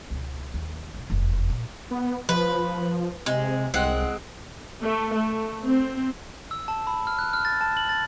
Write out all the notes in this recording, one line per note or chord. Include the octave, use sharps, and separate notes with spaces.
C#2 B2
D#2
F1 C3
F1 E2
A#1
B3
F3 B4
C3 G#3
C2 G#3 C4 F#5
A3
A3
C4
E6
A5
B5
F6
F#6
F6
A6
A5
F#7
A6